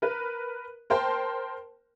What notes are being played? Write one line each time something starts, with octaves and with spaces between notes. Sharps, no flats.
A#4 B4
A#4 C5 G5 A5 C6